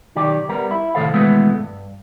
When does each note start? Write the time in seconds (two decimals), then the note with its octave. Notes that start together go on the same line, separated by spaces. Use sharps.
0.15 B1 D#3 G4 D5
0.49 G3 B3 A#4
0.71 E4
0.95 C2 A2 D#3 A4 C5 F5
1.14 D#2 B2 E3 G#3 A3 B3
1.59 G2